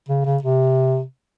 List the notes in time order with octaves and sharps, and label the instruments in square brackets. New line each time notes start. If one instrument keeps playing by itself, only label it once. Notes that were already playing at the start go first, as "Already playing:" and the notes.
[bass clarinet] C#3
C#3
C3